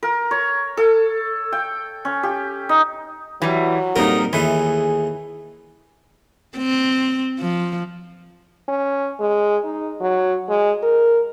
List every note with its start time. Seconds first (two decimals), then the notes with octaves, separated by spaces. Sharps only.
0.03 A#4
0.31 C#5
0.77 A4
1.52 G5
2.05 C#4
2.23 G4
2.69 D#4
3.42 E3 F#3 G3
3.96 F2 A#2 G3 D#4 A#4
4.33 D#2 E3 A3 D#4 G#4
6.57 C4
7.39 F3
8.69 C#4
9.20 G#3
9.64 D#4
10.01 F#3
10.49 G#3
10.83 A#4